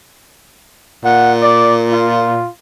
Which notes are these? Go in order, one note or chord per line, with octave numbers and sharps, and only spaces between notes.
A#2 F#5
D5
F4